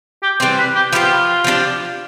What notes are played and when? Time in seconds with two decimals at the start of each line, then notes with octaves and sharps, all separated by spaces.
0.23 G4
0.40 E3 G3 C4 C5
0.58 B4
0.75 G4
0.93 F3 B3 D4 F4 G4
1.44 F3 B3 D4 G4